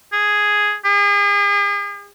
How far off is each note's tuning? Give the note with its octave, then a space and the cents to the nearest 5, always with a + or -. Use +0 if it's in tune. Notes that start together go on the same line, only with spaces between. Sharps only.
G#4 +0
G#4 -40